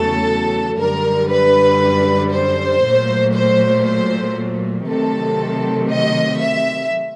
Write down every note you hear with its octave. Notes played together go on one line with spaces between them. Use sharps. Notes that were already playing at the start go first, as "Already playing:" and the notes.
Already playing: E2 C#3 F#3 A3 A4
F#2 D3 G3 A#4
B4
C5
A#2 F#3 A3
C5
C5
C3 D#3 F#3 A3 A4
D#5
E5